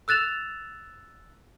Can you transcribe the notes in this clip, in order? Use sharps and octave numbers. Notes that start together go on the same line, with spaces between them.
E6 F#6 A6 E7 F7